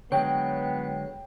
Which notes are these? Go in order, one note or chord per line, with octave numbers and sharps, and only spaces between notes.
D3 F#3 G#3 B3 C#5 G5